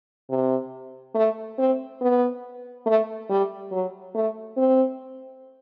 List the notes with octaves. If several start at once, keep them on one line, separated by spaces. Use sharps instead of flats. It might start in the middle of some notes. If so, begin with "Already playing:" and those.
C3
A3
C4
B3
A3
G3
F#3
A3
C4